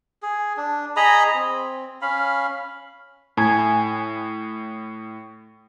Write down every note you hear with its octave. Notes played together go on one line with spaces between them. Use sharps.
G#4
D4
G#4 D#5 A#5 B5
C4
C#4 F5 B5
A2 G#5